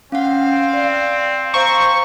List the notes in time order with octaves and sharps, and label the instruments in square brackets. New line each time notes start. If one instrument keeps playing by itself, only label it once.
[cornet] C4 [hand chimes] C#4 F#5 [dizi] F5
[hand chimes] D5
[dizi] C5 [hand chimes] F5 A#5 [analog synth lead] C#6